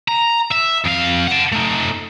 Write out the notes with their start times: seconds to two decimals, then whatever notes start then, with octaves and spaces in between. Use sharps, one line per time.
0.08 A#5
0.52 E5
0.86 F2 F5
1.28 F#5 A5
1.52 A3 D#4